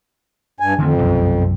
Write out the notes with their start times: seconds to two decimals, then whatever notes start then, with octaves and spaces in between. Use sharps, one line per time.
0.60 G2 G#5
0.79 F2 D3 D#3 A3
0.98 B1 F#2 C3